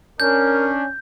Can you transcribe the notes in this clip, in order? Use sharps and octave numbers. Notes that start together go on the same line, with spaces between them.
C#4 D4 A#4 G6